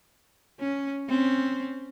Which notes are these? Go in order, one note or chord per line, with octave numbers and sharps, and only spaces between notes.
C#4
C4 C#4